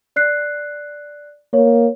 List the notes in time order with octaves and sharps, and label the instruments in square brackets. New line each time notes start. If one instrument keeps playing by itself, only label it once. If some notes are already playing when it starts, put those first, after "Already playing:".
[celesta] D5 F#6 C7
[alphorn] A#3 [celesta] C#5